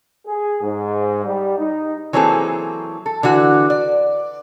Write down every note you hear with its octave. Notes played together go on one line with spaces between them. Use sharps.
G#4
G#2
G3
D#4
E3 F#3 A#3 C4 G#4 A4
A4
D3 E3 F#4
D5